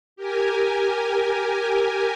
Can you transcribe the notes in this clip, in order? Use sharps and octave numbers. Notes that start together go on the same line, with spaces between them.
G4 A#4 G#5